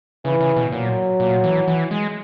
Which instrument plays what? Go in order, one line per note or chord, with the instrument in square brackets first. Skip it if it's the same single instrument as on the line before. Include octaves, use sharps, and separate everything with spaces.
[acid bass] C#3 [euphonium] E3
[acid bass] C#3
B2
[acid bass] A#2 [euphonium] F#3
[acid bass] A#2
E3
E3
G#3